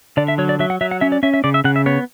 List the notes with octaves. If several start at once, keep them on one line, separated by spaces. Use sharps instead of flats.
D3 D5
E5
F#3 C#5
D5
F#3 E5
F#5
F#3 E5
F#5
C#4 E5
D5
C#4 E5
E5
C#3 D5
E5
C#3 F#5
E5
B3 C#5